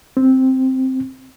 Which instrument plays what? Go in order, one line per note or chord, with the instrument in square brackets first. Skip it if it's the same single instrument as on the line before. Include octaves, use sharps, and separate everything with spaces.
[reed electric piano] C4